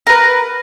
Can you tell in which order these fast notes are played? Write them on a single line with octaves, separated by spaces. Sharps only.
A#4 B4 A#5